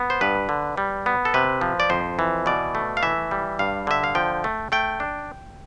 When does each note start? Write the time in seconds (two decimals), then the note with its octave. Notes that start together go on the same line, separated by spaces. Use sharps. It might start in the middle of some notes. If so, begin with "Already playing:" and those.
Already playing: B3
0.10 C5
0.21 G2 B4
0.49 D3
0.78 G3
1.06 B3
1.25 A4
1.34 C3 B4
1.61 F3
1.80 D5
1.90 F2 C5
2.19 E3
2.46 B2 D5
2.75 A3
2.97 F5
3.03 E3 E5
3.31 G3
3.59 G2 F5
3.87 D3 E5
4.04 F5
4.15 F3 G5
4.44 A3
4.72 A3 G5
5.00 D4